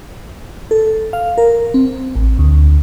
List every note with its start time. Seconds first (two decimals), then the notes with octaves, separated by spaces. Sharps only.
0.71 A4
1.13 F5
1.38 A#4
1.74 C4
2.16 A1
2.39 D2